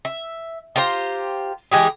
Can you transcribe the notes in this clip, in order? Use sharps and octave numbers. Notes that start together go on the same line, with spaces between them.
E5
F4 G4 C5 A#5
E3 G#3 G4 G#4